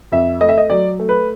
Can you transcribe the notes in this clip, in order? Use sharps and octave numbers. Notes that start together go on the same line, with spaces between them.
F2 E5
A3 D#5
E5
D#5
F#3 D5
A3
B4